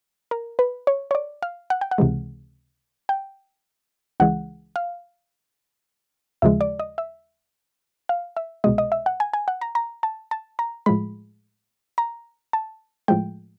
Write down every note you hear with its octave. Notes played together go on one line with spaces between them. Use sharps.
A#4
B4
C#5
C#5
D5
F5
F#5
G5
F#5
C#2 C3 E3 G#3
G5
C#2 C#3 E3 G#3 F#5
F5
D#2 C#3 F3 G#3 E5
D5
D#5
E5
F5
E5
C2 B2 G#3 D#5
D#5
E5
F#5
G#5
G#5
F#5
A#5
A#5
A5
A5
A#5
A2 F3 G#3 B5
A#5
A5
A2 F3 G#3 G5